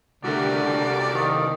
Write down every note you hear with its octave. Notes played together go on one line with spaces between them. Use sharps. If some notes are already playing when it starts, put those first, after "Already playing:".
C2 D3 A3 F#4 G4 A#4 D5
C2 A4
D#3